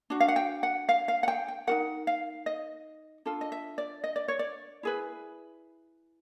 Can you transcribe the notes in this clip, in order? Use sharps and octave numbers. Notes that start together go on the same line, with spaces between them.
D4 F#4
F5
F#5
G5
F#5
F5
F5
F#5
G5
G5
D#4 F#4 A#4 F#5
F5
D#5
D4 F4 A4
D#5
E5
D5
D#5
D5
C#5
D5
E4 G#4 B4